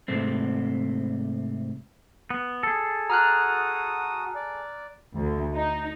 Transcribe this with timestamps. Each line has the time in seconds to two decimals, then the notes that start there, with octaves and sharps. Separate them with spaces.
0.08 G#2 C3 A3 C4
2.30 B3
2.63 G#4 A4
3.10 F#4 A#5 D#6 F6 F#6
4.35 D5
5.14 D2
5.55 D#4